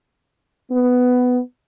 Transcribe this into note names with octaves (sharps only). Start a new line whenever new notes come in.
B3